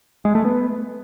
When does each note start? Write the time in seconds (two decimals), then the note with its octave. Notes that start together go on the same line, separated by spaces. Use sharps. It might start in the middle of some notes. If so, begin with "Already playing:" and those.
0.25 G#3
0.35 A3
0.45 B3